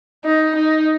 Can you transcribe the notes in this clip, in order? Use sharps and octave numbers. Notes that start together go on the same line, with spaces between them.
D#4
D#4